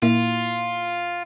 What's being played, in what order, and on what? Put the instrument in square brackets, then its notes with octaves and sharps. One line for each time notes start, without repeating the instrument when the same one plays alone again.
[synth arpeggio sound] A#2 A#3 E4 [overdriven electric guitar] F4